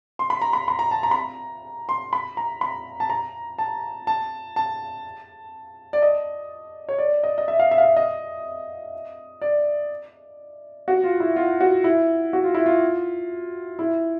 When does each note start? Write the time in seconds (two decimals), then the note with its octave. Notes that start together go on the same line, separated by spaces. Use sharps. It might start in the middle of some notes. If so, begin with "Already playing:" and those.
0.19 C6
0.30 B5
0.42 A#5
0.53 B5
0.68 B5
0.79 A#5
0.91 A5
1.03 A#5
1.11 B5
1.16 A#5
1.89 C6
2.13 B5
2.37 A#5
2.61 B5
3.00 A5
3.10 A#5
3.58 A5
4.07 A5
4.56 A5
5.93 D5
6.02 D#5
6.89 C#5
6.98 D5
7.24 D#5
7.38 D#5
7.48 E5
7.59 F5
7.71 E5
7.78 F5
7.84 E5
7.97 D#5
9.42 D5
10.88 F#4
11.04 F4
11.20 E4
11.36 F4
11.61 F#4
11.84 E4
12.33 F#4
12.44 F4
12.55 E4
12.66 F4
13.79 E4